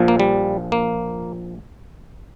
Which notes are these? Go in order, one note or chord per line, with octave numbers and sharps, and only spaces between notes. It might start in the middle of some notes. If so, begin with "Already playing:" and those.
Already playing: A#1 A#2 F3
A#3
G3
A#3